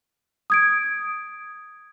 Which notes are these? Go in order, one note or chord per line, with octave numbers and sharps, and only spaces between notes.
D#6 G#6 D7